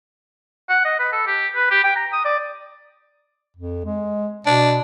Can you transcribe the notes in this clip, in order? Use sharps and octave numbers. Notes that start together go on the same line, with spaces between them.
F#5
D#5
B4
A4
G4
B4
G4
G5
A#5
D#6
D5
F2
G#3
B2 D4